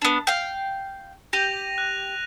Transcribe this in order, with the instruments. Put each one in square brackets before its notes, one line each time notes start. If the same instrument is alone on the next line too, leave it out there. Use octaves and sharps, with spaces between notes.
[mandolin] B3 D4
F5 G5
[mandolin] G4 [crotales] A#6 D#7 F7
[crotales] F#6